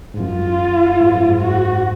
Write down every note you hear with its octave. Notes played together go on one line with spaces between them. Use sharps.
G#2
F#2 F4
G#2
F#2
G#2
G#2 F#4